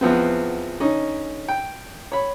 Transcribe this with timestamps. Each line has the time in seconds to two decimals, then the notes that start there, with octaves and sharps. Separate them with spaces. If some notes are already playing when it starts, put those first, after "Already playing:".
0.01 E2 F3 B3 C4
0.80 D3 C#4 D#4
1.48 G5
2.12 C#5 B5